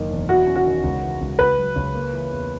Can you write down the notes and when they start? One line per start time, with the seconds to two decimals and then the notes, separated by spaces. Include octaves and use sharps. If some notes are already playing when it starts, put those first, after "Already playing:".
Already playing: F#1 D#3 A#3
0.10 E1
0.29 E4 F#4
0.47 C#4
0.56 F#4
0.65 D#3
0.84 C#2
1.02 E3
1.21 C#2
1.39 C#2 B4
1.58 F#3
1.76 C#2
1.94 A#3
2.13 E3
2.32 E2